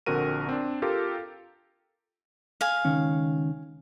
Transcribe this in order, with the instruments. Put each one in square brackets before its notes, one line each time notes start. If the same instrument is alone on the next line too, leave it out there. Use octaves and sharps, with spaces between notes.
[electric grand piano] A#1 D3 C4 F#4 A#4 D#7
C4 D4
F4 G4 A4 A#4 F5
[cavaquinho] F5 G#5
[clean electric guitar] C#2 D#3 C#4